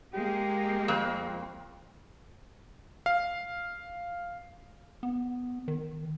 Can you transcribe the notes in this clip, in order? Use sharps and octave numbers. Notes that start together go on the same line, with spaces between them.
G#3 A#3 G4
F2
F5
B3
D#3